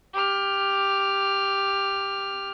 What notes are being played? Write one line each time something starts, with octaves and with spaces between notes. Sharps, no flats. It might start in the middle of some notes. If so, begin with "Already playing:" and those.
G4 F6